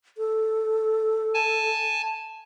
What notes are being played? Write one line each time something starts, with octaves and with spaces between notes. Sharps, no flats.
A4
G#5 A5